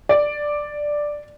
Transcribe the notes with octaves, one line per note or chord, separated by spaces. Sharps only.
D5